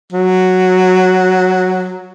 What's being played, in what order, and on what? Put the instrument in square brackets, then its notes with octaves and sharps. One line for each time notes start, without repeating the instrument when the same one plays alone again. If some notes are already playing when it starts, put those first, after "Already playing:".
[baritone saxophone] F#3